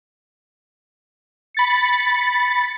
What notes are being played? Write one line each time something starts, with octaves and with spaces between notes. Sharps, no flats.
B5 A6 C#7